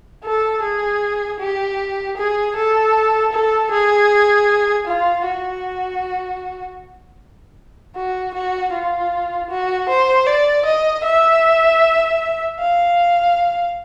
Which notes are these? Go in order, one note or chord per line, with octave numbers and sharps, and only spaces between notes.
A4
G#4
G4
G#4
A4
A4
G#4
F4
F#4
F#4
F#4
F4
F#4
C5
D5
D#5
E5
F5